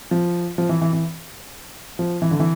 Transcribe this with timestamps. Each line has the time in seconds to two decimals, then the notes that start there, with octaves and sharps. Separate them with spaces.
0.11 F3
0.58 F3
0.69 E3
0.81 E3
0.93 E3
1.99 F3
2.22 E3
2.31 D3
2.40 E3